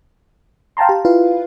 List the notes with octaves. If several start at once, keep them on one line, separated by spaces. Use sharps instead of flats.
F5 G5 A5 A#5 C6
G4
E4 F4 B4 F5